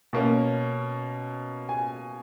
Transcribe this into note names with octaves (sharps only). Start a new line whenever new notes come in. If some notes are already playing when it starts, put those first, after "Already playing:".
B2 A#3 C#4
G#5